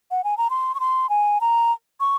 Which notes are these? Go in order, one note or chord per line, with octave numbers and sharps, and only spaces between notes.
F#5
G#5
A#5
C6
C#6
C6
G#5
A#5
C#6